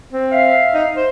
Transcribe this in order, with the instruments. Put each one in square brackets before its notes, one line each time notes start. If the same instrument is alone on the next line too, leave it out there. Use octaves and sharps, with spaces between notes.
[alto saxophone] C4
[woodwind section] E5 F5
[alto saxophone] D#4
C5